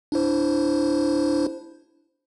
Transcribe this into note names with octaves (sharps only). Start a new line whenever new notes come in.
D4 E4 C5